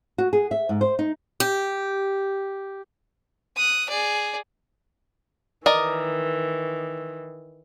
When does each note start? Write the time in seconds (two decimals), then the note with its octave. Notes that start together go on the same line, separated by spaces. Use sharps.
0.18 F#4
0.33 G#4
0.51 E5
0.69 G#2
0.81 C5
0.99 D#4
1.40 G4
3.56 D#6 F#6
3.89 G#4 D5
5.66 D#3 E3 A#4 D5 D#5